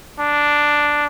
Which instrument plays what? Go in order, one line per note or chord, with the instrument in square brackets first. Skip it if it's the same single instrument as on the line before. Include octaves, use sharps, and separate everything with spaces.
[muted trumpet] D4